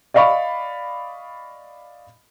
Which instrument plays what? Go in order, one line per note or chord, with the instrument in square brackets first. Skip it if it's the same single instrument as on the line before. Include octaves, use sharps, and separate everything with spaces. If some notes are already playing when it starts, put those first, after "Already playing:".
[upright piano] D5 D#5 F5 B5 C#6